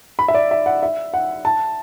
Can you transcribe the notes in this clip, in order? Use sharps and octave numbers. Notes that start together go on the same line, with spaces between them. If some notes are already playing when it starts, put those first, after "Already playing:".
B5
E5
D5
E5
F#5
E5
F#5
A5